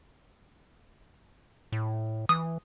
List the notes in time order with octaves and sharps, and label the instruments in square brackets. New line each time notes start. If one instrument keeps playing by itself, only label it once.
[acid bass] A2
[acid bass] E3 [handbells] D#6